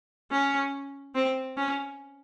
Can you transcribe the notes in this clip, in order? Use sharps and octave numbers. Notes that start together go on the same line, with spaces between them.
C#4
C4
C#4